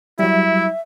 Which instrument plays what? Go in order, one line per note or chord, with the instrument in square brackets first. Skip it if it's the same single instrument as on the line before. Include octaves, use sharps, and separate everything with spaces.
[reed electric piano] F#3 G3 [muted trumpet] E4 [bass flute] E5